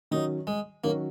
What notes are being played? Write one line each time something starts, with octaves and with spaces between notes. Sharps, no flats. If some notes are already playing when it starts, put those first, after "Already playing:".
D#3 F#3 C#4 D#4 F#4
G#3
D#3 F#3 A#3 C#4 F#4